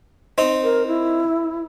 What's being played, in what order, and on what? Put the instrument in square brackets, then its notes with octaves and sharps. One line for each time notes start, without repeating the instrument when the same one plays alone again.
[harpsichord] C4 D#4
[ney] A#4
E4